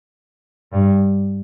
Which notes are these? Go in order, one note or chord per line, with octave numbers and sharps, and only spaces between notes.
G2